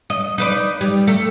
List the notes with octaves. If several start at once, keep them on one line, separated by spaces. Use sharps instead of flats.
D#5
D#4 B4 D5
G3
A3